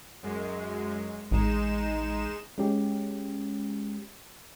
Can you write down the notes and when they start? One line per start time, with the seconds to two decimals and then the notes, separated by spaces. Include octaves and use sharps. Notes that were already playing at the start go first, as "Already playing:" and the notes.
0.23 F#2 G#3
1.31 A1 G#3 D#4 E7
2.58 G#3 C#4 G4